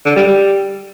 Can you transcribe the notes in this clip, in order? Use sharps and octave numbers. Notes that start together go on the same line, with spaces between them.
D3
G3
G3